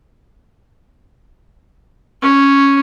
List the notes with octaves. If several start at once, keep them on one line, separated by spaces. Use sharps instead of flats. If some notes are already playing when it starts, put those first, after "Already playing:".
C#4